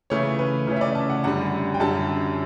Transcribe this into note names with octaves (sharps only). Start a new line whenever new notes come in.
C#3 E3 A3 C#4 C#5
B4
C#3 E3 A3 C#4
E5
D5
A5
F#5
F#2 D3 G3 F#5
G5
F#2 D3 G3 A5